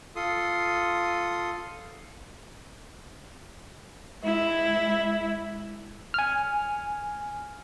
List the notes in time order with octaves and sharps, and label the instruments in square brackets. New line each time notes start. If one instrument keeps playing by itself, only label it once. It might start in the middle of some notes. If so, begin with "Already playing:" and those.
[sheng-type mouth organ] F4 A4 C6 D#6
[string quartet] G#3 E4
[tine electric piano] G#5 F6